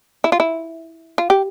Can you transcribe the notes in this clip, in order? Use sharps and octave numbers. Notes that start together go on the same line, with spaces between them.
E4
F4
E4
F4
G4